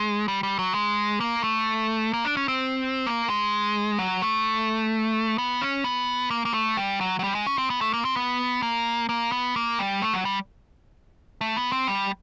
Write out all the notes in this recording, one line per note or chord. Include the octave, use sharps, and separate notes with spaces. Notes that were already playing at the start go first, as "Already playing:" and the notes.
Already playing: G#3
G3
G3
F#3
G#3
A#3
A3
A#3
D4
C#4
C4
A#3
G#3
F#3
A3
B3
C#4
B3
A#3
A#3
A3
G3
F#3
F#3
G3
G#3
C#4
C4
B3
A3
A#3
C4
B3
A#3
A#3
B3
A#3
G3
A3
F#3
G3
A3
B3
C4
G3